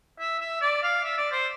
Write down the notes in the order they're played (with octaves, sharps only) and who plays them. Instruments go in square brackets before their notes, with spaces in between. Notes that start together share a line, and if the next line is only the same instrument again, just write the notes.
[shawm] E5
E5
D5
F5
E5
D5
C5